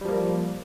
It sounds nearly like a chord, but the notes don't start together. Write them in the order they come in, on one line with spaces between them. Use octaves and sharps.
G3 F3 A#3